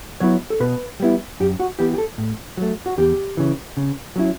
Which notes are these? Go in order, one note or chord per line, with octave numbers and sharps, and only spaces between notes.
F#3 B3 E4 C#5
A4
B2 B4
G3 B3 E4
F#2 G4
F#4
E3 B3 G4
G4
A4
A2
F#3 A3
F#4
E2 G4
C#3 E3
C#3
F#3 C#4 E4